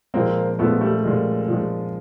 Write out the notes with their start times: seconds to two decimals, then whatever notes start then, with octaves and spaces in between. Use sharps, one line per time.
0.14 A#2 F3 G#3 A#3 C4
0.59 A#2 F3 G#3 A3 B3
0.81 G3 A3
1.04 A#2 F3 G#3
1.48 A#2 F3 G#3